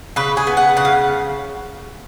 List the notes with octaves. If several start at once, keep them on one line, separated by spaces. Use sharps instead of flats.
C#3 B4
G#4
B3
F#5
C#3 F#5
F5